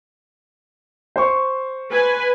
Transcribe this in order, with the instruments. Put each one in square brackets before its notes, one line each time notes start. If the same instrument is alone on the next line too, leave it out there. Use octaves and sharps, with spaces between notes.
[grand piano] C5 C#6
[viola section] B4 G#5